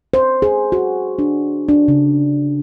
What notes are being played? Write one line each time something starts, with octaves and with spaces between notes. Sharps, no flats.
C5
G#4
F#4
D4
D4
C#3